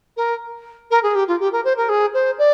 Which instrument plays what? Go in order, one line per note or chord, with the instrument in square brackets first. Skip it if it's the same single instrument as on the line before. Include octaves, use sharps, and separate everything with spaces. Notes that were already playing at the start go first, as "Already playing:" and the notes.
[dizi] A#4
A#4
G#4
G4
F4
G4
A#4
C5
A#4
G#4
C5
D5